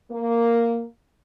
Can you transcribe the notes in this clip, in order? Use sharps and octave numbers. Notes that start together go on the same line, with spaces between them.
A#3